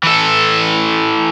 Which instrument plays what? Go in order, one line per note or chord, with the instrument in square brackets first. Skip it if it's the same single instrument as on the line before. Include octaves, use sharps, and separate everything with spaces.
[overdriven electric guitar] E3 A4